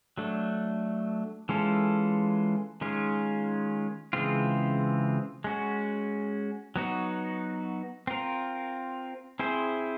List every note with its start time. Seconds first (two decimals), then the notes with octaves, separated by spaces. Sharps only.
0.18 F#3 A3 D4
1.49 E3 G#3 C#4 F4 A4
2.81 D#3 G#3 C#4 F4
4.13 C#3 E3 G#3 C4 F4
5.44 G#3 C#4 F#4
6.76 F#3 B3 D#4 F#4
8.07 C4 F4 A#4
9.39 C4 E4 G#4 C5